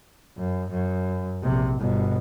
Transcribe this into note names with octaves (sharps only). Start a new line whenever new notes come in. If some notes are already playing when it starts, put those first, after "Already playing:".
F#2
F#2
A#1 C3
G1 B2